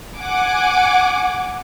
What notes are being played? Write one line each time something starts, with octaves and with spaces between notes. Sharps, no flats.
F#5 G#5 D6